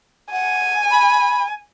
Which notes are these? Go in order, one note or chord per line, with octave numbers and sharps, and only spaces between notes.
F#5 G#5
B5